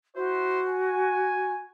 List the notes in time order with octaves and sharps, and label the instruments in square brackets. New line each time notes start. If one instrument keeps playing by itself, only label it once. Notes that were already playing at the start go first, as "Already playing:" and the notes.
[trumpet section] E4 C5 [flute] F#4
[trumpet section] G#5